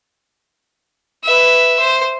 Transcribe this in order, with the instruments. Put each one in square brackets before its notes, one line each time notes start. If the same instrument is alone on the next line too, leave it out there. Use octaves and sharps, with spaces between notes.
[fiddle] B4 E5
C5